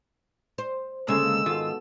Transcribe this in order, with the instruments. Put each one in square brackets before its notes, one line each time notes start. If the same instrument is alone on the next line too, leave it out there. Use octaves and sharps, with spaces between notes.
[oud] C5
[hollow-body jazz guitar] D2 C#3 [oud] G#3 [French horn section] A#3 A4 [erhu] E6
[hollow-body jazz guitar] G#2 D#3 F4 [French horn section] B3 F#4 A4